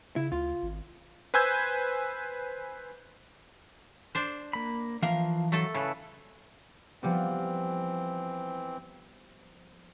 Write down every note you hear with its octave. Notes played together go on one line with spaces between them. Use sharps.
C#3 E4
D2 F4
G#1
B4 C5 G#5 E6 G6 G#6
D4 C5
A#3 B5
E3 F3 A#4 F5
F#3 A3 A4
C#3 E4 A4 B4
E3 F3 G3 B3 C4